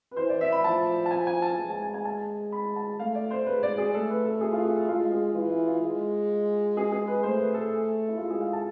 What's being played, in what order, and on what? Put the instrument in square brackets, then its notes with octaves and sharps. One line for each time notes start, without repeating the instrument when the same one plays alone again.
[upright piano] B4
[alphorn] E3 [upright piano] C5
[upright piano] D5
E5
B5
[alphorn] F3 [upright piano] A5
[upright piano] A5
G#5
G#5
A5
[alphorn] G#3
[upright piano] A5
G#5
G#5
A5
B5
A5
[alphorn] A3 [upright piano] F5
[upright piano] D5
C5
[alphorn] G#3 [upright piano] B4
[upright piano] D5
G#4
[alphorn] A3 [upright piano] A4
[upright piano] B4
A4
G#4
F4
G#4
A4
[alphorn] G#3 [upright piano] F4
[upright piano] G#4
[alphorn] E3 [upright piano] F4
[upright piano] E4
F4
[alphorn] G#3
[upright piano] G#4
G#4
B4
[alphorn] A3 [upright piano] C5
[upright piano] B4
A4
E4
[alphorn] G#3 [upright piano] F4
[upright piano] G#4
F5
A5